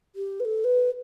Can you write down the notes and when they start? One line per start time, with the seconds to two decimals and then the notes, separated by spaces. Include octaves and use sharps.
0.16 G4
0.40 B4
0.45 A4
0.64 B4